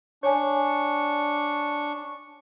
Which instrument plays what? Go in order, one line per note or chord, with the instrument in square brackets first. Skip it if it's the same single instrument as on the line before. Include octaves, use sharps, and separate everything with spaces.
[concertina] D4 C#6 [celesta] C#5 G#5